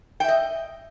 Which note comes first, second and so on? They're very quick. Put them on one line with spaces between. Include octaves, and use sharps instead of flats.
G5 E5 D#5